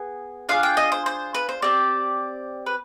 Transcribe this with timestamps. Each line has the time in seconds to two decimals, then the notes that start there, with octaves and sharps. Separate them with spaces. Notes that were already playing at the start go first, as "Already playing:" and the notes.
Already playing: B3 G#4
0.49 D4 F4 G#4 F5
0.63 G5
0.77 D#5
0.92 C5
1.06 C5
1.35 B4
1.49 C5
1.62 C4 G4 D5
2.66 B4